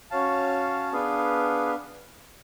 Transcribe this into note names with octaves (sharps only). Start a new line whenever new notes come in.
C#4 F#4 C#5 F5 A5
B3 D4 G#4 B4 F5